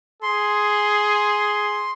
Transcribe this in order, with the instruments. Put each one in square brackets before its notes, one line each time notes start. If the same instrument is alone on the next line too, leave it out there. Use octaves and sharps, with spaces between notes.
[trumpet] G#4 [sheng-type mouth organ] C6